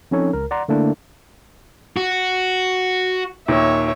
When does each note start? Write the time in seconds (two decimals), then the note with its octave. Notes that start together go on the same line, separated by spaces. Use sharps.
0.11 F3 C4 C#4 D#4 A4 C#5
0.33 C#2 A#4
0.51 D5 F#5 A#5 C6
0.68 D3 A3 A#3 D4 E4
1.97 F#4
3.48 D#2 A#2 D#3 C#5 E5